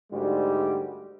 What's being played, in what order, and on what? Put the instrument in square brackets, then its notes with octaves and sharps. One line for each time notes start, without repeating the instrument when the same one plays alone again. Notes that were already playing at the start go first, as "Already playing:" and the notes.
[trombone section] D2 G#2 G3